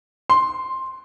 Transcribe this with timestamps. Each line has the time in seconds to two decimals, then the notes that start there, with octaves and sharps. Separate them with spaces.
0.30 C6